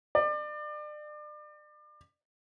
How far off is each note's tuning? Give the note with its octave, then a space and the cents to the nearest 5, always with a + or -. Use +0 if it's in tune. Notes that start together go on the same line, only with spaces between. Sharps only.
D5 +35